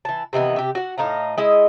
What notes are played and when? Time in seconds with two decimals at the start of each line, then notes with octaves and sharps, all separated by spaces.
0.05 E3 A5
0.33 C3 D#3 E3 B3
0.56 C3 G4
0.75 F#4 F#5
0.98 A2 D#4 F5 A#5
1.38 G#3 E4 D#5